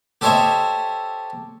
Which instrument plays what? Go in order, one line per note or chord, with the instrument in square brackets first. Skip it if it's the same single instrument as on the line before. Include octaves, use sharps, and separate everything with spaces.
[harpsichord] G4 A4 C5 C#5 D#5 E5